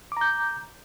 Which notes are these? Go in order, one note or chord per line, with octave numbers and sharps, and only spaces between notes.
A#5 D6 G6